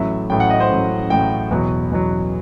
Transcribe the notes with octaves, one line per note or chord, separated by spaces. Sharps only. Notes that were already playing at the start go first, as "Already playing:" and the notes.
Already playing: A1 A2 F#3 E5
A1 A2 F#3 G5
F#5
D#5
C5
A1 A2 F#3
A1 A2 F#3 G5
E2 B2 F#3
E2 B2 F#3